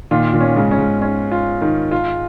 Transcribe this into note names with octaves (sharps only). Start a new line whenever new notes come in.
A#2 D#3 F4
A#2 D#3
C#4
G#2 C#3
C#4
G#2
C#4
F4
D#3
F4